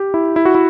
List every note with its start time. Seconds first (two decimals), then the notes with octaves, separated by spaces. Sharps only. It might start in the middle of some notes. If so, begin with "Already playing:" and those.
Already playing: G4
0.14 E4
0.36 E4
0.45 F#4
0.55 E4